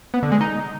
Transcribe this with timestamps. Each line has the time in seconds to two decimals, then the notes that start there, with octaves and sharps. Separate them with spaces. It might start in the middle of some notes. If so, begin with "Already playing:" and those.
0.14 B3
0.23 D3
0.32 G#3
0.41 D#4